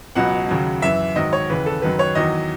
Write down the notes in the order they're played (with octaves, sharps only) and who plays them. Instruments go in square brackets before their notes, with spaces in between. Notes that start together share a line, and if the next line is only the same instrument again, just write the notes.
[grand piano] C#2 B2 F#3 F#5
D#2 C#3 F#3
F#2 E3 E5
G#2 D#3 F#3 D#5
C#5
D#2 C#3 E3 B4
A4
F#2 D#3 F#3 B4
C#5
E2 D#3 F#3 D#5